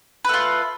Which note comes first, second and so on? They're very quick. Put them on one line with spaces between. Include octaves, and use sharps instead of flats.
B4 A3 F4